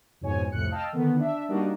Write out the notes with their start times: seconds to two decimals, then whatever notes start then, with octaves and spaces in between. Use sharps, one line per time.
0.21 F2 G#2 B2 C#5 G#5
0.52 C2 F2 A2 F#6 C#7
0.71 D#5 F5 G5 A5 E6 F6
0.93 D3 D#3 B3
1.16 D4 E5
1.49 G3 A#3 D4 D#4 F#4 D#5